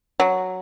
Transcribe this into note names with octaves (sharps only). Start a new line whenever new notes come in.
F#3